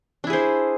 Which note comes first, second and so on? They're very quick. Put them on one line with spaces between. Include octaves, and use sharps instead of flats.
D4 E4 G#4 C5